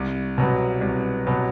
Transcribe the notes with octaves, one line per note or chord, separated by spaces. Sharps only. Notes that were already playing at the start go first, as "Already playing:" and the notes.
Already playing: C2
B2 F#3 B3
C2
B2 F#3 B3